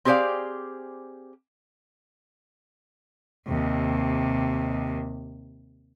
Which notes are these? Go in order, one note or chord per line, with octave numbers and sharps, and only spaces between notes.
C4 G4 G#4 C5 D5 F5
D#2 C3